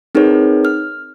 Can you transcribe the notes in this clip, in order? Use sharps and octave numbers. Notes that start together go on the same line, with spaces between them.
C4 D#4 G#4 A#4 B4 C#5
F6